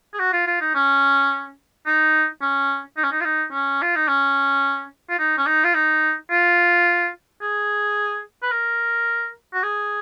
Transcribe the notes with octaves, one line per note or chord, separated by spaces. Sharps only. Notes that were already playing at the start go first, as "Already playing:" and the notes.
G#4
F#4
F4
F4
D#4
C#4
D#4
C#4
D#4
C#4
D#4
F4
D#4
C#4
F4
D#4
C#4
F4
D#4
C#4
D#4
F4
D#4
F4
G#4
B4
A#4
F#4
G#4